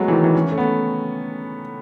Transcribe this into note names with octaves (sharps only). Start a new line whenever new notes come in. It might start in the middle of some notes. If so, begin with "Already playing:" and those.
Already playing: F#3 G#3 A3 B3
E3
D#3
E3
C#4
A3
B3